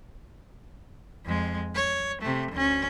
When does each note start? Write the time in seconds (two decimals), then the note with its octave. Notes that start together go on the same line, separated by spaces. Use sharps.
1.25 F2 G#3
1.75 C#5
2.22 C3 A3
2.52 D2 C#4